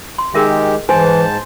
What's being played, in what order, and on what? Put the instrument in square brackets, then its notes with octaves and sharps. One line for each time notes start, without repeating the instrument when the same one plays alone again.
[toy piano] C6
[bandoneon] D#3 G#3 G4 [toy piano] G#4 A#4 E5
[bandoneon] G#2 A5 [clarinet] E3 [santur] C5 [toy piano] G#5